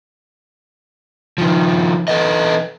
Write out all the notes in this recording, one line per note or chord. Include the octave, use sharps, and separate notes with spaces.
D#3 F3
E3 A4 B4 D#5